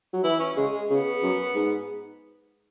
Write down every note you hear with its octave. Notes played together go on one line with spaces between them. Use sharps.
F#3
E3 E4
C#4
C#3 G#3
G#3
C#3 B3
F#2
G#2